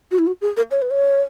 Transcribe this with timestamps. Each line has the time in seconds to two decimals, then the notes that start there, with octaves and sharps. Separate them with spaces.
0.11 F#4
0.19 E4
0.27 F#4
0.41 G#4
0.57 A#4
0.71 C#5
0.82 B4
0.91 C#5